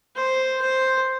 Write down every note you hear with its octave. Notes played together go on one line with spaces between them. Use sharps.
C5
C5